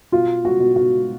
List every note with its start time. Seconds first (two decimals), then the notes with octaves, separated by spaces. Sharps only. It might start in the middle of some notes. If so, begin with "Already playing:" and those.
0.12 B2 F4
0.45 F#4
0.60 B2
0.76 F#4